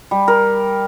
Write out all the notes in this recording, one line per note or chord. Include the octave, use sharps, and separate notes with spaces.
G3
A#4